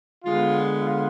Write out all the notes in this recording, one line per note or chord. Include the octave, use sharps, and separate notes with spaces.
D3 G#3 B3 F4
F4